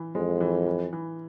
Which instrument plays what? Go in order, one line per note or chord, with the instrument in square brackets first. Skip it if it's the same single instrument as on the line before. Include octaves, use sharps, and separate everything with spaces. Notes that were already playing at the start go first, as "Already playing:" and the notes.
Already playing: [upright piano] E3
[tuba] F2 [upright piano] G#3
[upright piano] E3
E3
E3